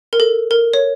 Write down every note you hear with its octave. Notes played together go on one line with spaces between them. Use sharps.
A#4
A4
A#4
C#5